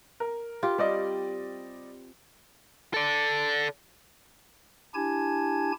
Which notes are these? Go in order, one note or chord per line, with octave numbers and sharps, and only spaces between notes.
A#4
F4 G4
G3 C4 D5 D#5
A4 D5
D4 E4 G4 G#5 A5 G#6